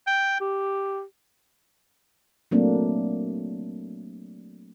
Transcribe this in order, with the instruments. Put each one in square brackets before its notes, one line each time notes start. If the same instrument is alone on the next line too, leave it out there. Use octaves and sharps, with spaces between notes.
[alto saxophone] G5
G4
[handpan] F#3 A3 A#3 C4 D4